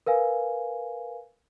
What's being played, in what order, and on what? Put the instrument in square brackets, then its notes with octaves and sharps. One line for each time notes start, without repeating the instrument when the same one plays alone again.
[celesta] A#4 B4 F5 G#5